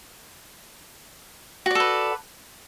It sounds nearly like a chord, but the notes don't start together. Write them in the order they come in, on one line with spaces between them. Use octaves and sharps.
F#4 D5 A4 B4